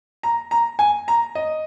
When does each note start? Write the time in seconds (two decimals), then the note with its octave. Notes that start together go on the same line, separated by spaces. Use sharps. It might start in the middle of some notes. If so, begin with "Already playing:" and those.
0.23 A#5
0.51 A#5
0.79 G#5
1.08 A#5
1.35 D#5